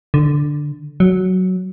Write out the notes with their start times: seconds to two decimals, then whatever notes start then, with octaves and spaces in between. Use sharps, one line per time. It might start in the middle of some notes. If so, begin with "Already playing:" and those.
0.14 D3
1.00 F#3